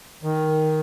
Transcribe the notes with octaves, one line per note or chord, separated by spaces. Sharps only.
D#3